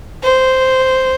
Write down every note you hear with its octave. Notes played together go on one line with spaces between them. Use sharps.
C5